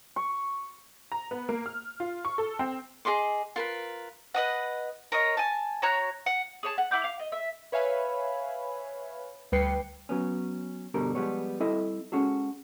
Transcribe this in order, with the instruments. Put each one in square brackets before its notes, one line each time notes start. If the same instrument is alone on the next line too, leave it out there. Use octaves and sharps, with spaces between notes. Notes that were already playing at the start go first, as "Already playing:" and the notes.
[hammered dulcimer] C#6
[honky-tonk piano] A#5
B3
A#3
F6
F4
C#6
A4
C4
[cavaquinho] G#4 D#5 C6 D6
F4 A#4 B4
[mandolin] B4 D#5 F#5
A#4 C#5 D#5
G#5 A5
F#4 C#5 A#5 F#6
F#5
G#4 C#5 A5
F#5
E4 F#5 D6 G6
F5
D#5
E5
[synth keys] B4 C#5 E5 F5 G#5 B5
D2 G3 B4 G5 C7 C#7
[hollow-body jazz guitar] F#3 B3 C#4
G2 B2 D3 G3 A#4
F3 G3 G#3 B3 C#5
G3 C4 E4 A4 D#5 E5
G#3 C#4 F#4 G#4 A4